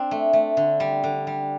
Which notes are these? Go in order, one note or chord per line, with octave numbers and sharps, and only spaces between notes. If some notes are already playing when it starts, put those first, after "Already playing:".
Already playing: C4 D4
A3
A3
D3
G3
D3
G3